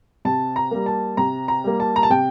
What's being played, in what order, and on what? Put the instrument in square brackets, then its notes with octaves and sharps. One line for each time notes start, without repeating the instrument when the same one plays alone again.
[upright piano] C3 A5
A#5
G3 A#3
A5
C3 A#5
A#5
G3 A#3
A5
A#5
A5
C3 G5